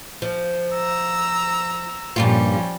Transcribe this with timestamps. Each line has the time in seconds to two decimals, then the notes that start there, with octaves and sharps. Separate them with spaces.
0.22 F3
0.75 A#5 E6
2.16 G2 A#2 F3 G3 C#4 F4